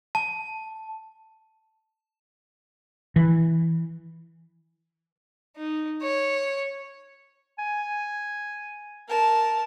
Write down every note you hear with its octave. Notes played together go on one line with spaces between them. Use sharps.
A5
E3
D#4
C#5
G#5
A#4 A5